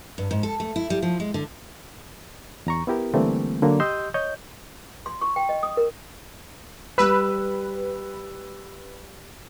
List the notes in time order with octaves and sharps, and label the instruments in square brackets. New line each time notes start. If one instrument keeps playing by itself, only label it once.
[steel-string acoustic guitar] G2
G#2
A4
A3
E4
G3
F3
G#3
D3
[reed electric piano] E2 A#5 C#6
B3 E4 G4 A#4
D3 E3 G3 A3 A#3 C4
D3 F#3 A#3
G4 D#5 C6 D#6 E6 G6
C#5 D#5 G6
[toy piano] C6
C#6
G5
D#5
D#6
A#4
[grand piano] G3 E6 [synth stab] B4